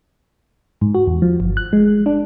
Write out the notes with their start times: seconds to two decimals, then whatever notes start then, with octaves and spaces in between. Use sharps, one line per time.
0.81 G#2
0.95 F#4
1.07 E2
1.22 F3
1.40 G1
1.57 F#6
1.73 G#3
2.06 D4